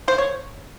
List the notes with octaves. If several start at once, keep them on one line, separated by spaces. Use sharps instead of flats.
A#3 C5
C#5